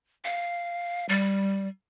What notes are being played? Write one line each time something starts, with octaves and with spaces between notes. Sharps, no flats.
F5
G3